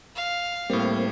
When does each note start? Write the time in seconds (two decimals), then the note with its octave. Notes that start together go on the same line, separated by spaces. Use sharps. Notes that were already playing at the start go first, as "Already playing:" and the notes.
0.15 F5
0.70 A2 G3 A#3 C4